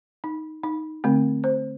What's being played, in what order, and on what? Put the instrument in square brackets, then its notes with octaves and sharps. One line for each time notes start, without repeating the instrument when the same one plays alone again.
[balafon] D#4
D#4
D3 A3 C4
C5